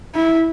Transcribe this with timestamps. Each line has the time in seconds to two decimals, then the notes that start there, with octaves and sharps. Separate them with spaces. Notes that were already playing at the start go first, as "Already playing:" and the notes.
0.15 E4